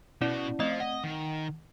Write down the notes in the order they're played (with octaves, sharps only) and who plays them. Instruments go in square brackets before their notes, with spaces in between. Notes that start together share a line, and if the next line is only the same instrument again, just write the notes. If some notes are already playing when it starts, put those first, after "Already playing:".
[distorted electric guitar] B2 F#4 [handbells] C#4 E4 D5
[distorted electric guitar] F3 [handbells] A3 C4 D#5
[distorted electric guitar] D#5 [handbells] F#5
[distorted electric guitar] D#3